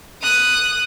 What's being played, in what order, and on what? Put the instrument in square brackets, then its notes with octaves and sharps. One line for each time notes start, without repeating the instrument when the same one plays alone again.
[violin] D#6 F#6